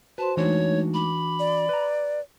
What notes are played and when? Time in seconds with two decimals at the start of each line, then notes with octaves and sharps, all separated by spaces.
0.18 F#4 B4 C5 A5 C6
0.37 E3 G#3 A3 D4 D#4 F#4 C#5
0.94 B5 D6
1.39 D5
1.69 B4 A#5